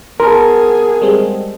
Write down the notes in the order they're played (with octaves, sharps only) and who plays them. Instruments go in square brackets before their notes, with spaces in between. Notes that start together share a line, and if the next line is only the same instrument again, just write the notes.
[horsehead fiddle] B3 G#4 [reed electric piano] A#4 [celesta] A5 C6
[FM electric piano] G3 G#3 C4